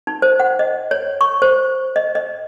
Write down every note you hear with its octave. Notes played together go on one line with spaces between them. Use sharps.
D#4
C5
F#5
D#5
C#5
C#6
C5
D#5
D#5